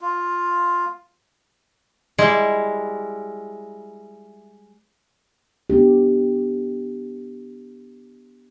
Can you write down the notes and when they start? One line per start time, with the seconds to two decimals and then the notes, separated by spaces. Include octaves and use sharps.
0.01 F4
2.18 G3 G#3 E4
5.70 B3 D4 G4